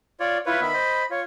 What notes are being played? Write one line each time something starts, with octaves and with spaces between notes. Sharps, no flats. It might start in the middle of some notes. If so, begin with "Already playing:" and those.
F4 C#5 D5
E4 F4 B4 C#5
D#3 B3 E5 B5
C5 D#5
F4 C#5